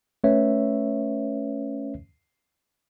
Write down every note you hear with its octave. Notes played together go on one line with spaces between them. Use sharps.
A3 C#4 B4 C#5 E5